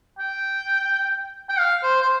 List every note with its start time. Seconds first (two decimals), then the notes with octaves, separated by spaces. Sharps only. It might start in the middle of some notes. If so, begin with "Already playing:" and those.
0.19 G5
1.49 G5
1.59 F5
1.83 C5
2.02 C5